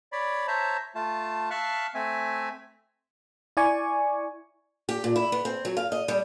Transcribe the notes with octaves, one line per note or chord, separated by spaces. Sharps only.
C#5 D5 B5
C5 C#5 E5 A5 A#5
A3 F4 A5
E5 F5 A5 C#6 F6 F#6
A3 C4 E5 G#5
E4 D5 G#5 C#6
G4
A#2
E4
B3
C4
F#3
F5
D#5
G3